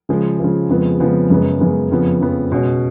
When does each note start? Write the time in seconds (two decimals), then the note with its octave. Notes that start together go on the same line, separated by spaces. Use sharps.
0.09 C#3 F3 G#3
0.39 C#3 F3 G#3
0.69 F2 C#3 F3 G#3 B3
1.00 F2 C#3 F3 G#3 B3
1.30 F#2 C#3 G#3 B3
1.60 F#2 C#3 G#3 B3
1.91 F2 C#3 F3 B3
2.21 F2 C#3 F3 B3
2.52 B2 G#3 C#4 F#4 C#5